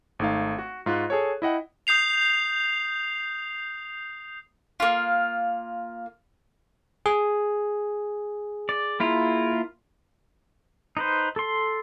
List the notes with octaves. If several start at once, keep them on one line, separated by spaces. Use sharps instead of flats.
G#1 A3 D#4 F5
F#4
G#2 F4 F#4 C6 F#6
G#4 A4 C#5
E4 D#5 F#5 G5
D#6 G6 C7 F7
A#3 F4
G#4
D5
A#3 E4 F4
D#4 B4 C5
A4 C6